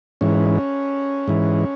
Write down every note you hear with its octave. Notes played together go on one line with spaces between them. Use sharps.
G#2 E3 C#4
G#2 E3